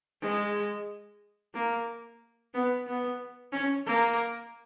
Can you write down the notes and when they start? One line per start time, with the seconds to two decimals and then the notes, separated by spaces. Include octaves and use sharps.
0.22 G#3
1.54 A#3
2.54 B3
2.87 B3
3.52 C#4
3.86 A#3